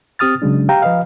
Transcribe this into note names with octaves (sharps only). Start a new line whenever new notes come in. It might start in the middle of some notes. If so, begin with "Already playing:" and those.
C4 G4 D#6 F6 A6
C#3 F#3 G#3 D4
G4 F5 G5 A#5
F3 B4 D#5 F5